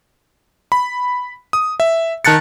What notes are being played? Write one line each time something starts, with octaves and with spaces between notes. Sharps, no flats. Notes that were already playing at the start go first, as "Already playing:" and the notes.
B5
D#6
E5
D#3 A5 F#6 A6 C#7